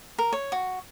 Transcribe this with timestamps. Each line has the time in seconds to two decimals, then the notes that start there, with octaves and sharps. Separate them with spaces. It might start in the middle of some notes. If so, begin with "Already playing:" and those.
0.19 A#4
0.33 C#5
0.52 F#4